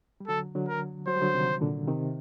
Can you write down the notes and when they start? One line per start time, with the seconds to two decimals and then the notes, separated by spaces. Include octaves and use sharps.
0.20 G3
0.28 D3 F#3 A4
0.55 D3 F#3
0.69 A#4
1.08 F#3 C5
1.15 G3
1.22 D3 F#3
1.34 C3 D#3
1.61 A#2 D3
1.87 C3 D#3